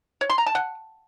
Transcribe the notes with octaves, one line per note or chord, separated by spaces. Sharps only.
C#5
C6
A#5
A5
F#5